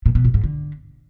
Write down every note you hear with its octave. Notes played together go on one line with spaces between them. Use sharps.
A#2
B2
A2
G#2
D3